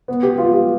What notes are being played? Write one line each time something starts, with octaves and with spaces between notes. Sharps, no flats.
B3
G4
F4
G4